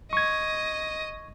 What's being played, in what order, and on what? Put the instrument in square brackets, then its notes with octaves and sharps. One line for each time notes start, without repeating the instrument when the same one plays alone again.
[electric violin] D#5 [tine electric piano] C#6 G#6